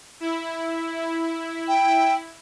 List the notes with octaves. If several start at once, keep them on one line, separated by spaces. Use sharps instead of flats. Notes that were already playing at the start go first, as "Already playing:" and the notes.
E4
G5